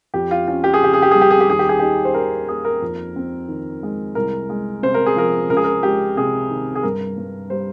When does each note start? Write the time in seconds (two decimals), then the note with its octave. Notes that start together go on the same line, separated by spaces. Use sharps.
0.14 F2 G4
0.31 F4
0.48 C#4 F4
0.64 G4
0.74 G#4
0.81 C#3 G4
0.94 G#4
1.02 G4
1.11 G3 G#4
1.21 G4
1.30 G#4
1.41 G4
1.48 D#2 G#4
1.59 G4
1.69 G#4
1.79 D#4 G4
2.05 C5
2.14 D#3 A#4
2.48 A#3 G#4
2.65 A#4
2.82 F2
3.16 C4
3.49 D#3
3.83 G#3
4.15 C2 A#4
4.49 G#3
4.83 C3 C5
4.94 A#4
5.06 G#4
5.16 F3 A#4
5.49 C#2 A#4
5.57 G#4
5.64 A#4
5.83 G#3 G4
6.17 C3 G#4
6.50 D#3
6.75 G#4
6.83 G2 A#4
7.18 G2
7.50 G3 C5